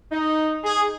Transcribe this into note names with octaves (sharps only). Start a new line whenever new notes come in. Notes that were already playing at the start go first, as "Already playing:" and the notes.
D#4
G#4